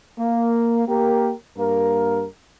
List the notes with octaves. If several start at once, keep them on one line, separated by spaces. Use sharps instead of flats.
A#3
A#3 G4 A#4
G2 A#3 A#4